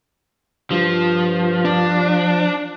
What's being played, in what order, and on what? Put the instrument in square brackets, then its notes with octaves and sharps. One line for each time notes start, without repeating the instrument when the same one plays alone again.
[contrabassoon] G2 [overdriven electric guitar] F3
[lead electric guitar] D4